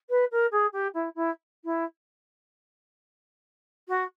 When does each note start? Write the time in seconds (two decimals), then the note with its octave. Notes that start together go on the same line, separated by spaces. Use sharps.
0.10 B4
0.31 A#4
0.52 G#4
0.73 G4
0.94 E4
1.15 E4
1.64 E4
3.88 F#4